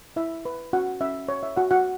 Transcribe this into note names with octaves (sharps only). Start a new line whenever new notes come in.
E4 E5
B4
C#4 F#4 F#5
C#4 E5
C#5
E5
F#4 F#5
F#4 F#5